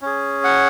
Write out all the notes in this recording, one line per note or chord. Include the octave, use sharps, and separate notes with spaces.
C#4 G#4
F#5